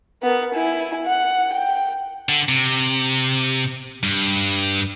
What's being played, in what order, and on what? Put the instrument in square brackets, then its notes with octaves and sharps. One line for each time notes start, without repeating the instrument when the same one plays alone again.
[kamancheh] B3 A#4
E4 G#5
F#5
G5
[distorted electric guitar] D3
C3
G2